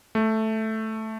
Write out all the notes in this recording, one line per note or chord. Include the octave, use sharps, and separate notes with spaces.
A3